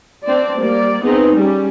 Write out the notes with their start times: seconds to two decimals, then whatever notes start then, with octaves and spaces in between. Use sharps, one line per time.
0.25 C4 D4 C5 D5
0.59 G3 A#3 D5
1.02 B3 C4 D#4 G#4
1.34 G3 C#4